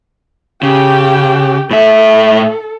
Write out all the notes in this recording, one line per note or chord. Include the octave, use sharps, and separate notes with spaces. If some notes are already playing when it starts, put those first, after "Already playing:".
C#3 G4 G5
A2 A4 E5